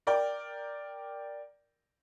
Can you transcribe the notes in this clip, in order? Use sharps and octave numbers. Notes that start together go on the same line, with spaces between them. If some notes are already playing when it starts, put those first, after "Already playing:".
A#4 D5 G5